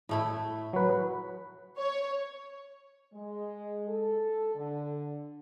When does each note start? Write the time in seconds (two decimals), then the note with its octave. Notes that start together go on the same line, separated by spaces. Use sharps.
0.09 A2 A3 E4
0.73 F#3 B4
1.78 C#5
3.14 G#3
3.88 A4
4.55 D3